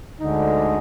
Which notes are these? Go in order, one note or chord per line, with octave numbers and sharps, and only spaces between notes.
D2 D3 G#3 D#4